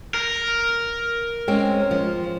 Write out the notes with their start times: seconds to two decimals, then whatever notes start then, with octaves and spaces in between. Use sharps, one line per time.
0.14 A#4
1.48 G#3 C4 C#4
1.91 F3